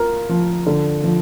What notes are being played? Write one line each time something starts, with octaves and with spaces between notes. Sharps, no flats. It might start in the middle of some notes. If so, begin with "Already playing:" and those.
Already playing: F4 A#4
F3
D3
F3